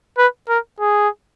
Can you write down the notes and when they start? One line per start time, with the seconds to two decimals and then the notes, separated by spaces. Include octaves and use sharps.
0.18 B4
0.49 A#4
0.80 G#4